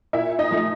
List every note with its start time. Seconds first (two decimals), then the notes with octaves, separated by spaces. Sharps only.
0.13 A#2 E4 E5
0.39 D#4 D#5
0.51 F3 A3